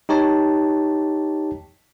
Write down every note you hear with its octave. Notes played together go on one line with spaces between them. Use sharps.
D#4 G4 C#5 A5